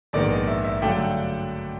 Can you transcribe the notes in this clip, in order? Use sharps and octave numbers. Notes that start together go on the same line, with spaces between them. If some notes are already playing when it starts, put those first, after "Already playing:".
A#1 G#2 D#3 G#3 B3 D5
D#5
E5
E5
G2 D3 F#3 A3 D4 G5